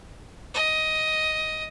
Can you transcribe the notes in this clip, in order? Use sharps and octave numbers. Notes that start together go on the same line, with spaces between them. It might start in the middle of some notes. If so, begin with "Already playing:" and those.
D#5